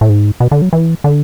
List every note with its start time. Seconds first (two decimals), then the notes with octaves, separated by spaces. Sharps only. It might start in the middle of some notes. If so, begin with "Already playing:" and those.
0.01 A2
0.09 G#2
0.40 B2
0.51 D3
0.62 F#3
0.73 E3
1.04 D3